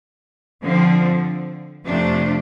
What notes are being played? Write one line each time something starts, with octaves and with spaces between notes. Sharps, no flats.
D3 F3 C4
F2 C3 F3 A3 D4